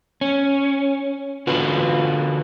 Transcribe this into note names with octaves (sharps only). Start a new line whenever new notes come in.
C#4
D3 F4 F#4 B4